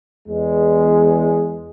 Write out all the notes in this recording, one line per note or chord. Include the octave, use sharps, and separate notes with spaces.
E2 G#3